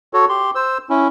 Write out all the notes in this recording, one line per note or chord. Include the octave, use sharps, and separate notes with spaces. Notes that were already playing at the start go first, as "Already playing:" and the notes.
F#4 A4 C#5
G4 C6
C5 E6
C#4 E4